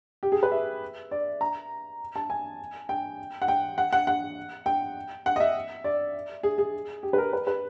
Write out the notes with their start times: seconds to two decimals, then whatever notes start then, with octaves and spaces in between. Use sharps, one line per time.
0.23 G4
0.32 G#4
0.43 B4
0.52 E5
1.11 D5
1.41 A#5
2.16 A5
2.30 G#5
2.89 G5
3.42 F#5
3.48 G5
3.78 F#5
3.93 F#5
4.07 F#5
4.66 G5
5.26 F#5
5.36 D#5
5.40 E5
5.84 D5
6.43 G#4
6.58 G#4
7.03 G4
7.13 B4
7.18 A#4
7.33 B4
7.47 B4